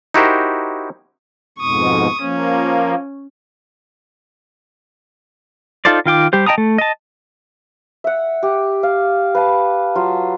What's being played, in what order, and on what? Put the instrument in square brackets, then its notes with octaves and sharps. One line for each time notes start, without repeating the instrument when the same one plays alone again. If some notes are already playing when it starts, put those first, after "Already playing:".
[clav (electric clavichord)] D#4 E4 F#4 G4 A#4 C5
[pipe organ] F2 G#2 B2 [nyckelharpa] C#6 D#6
[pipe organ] F3 A#3 [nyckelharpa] C#4
[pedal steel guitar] D#4 F4 A4 C5 D5
D#3 F4 G5 D6
G3 G4 C5
D#5 G5 A5 A#5 D#6
A3
D#5 A5
[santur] E5 F#5
G4
F5
B4 F5 A5
F#3 F4